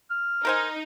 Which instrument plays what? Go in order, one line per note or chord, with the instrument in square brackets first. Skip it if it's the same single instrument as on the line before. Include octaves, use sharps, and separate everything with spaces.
[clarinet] F6
[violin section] D#4 [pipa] A#4 C5 G#5